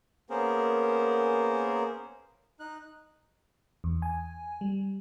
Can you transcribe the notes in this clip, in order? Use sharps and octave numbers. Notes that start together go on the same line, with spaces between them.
A#3 B3 C#4 G#4 A#4 C5
D#4 F#6
E2
G#5
G3